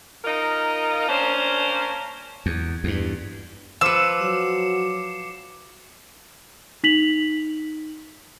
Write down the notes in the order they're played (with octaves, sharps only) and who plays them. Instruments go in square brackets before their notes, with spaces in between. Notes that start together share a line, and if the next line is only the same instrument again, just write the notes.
[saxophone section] D#4 F4 A#4 D#5
A#3 C#4 D4 C5
[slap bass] E2
E2 G2
[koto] F3 B4 [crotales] D6 C7 C#7 [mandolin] E6
[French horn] F#3 [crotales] E7
[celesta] D#4 B6 F7 F#7